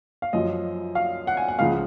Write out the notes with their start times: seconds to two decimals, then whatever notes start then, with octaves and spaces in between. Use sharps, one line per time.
0.22 F5
0.33 F#2 F3 D#5
0.95 F5
1.27 F#5
1.37 G#5
1.48 F#5
1.59 C#2 C#3 F3 F5